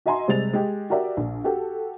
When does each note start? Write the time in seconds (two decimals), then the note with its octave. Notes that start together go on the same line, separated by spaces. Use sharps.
0.06 F#4 D#5 E5 G#5 A#5 C6
0.28 C3 G3 G#3 A6 F7
0.54 G#3 G4
0.90 F#4 G4 A#4 D5 E5
1.17 A#1
1.44 F#4 G4 A4